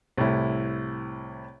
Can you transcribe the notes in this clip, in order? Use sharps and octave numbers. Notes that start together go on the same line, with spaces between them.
C2 A2 E4